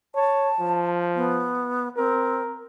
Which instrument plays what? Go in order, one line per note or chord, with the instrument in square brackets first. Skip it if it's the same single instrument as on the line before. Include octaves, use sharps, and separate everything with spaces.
[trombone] C#5 [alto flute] A5
[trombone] F3
[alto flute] B3
[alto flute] C4 [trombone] A#4